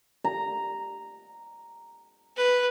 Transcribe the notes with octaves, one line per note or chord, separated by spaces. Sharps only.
A#5
B4